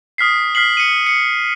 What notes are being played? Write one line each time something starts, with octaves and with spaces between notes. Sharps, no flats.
D#6 F6 B6 C7
F6 B6 C7 F#7
C#7 D#7
C#7